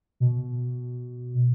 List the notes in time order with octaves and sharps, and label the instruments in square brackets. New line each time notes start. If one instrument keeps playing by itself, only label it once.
[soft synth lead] B2